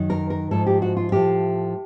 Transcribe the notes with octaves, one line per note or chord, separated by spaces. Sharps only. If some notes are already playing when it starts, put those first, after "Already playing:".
Already playing: F#2 D#3
A#4
A#4
G#2 F3 A4
G4
F#4
F4
A2 F3 G4